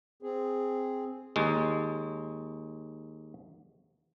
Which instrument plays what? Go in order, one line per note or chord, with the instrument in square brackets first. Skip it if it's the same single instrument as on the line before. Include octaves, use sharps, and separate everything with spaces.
[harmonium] C4 G#4
[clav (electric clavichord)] D#2 G#3